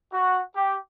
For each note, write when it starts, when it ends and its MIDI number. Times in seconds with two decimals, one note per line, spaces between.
0.13 0.42 66
0.56 0.77 67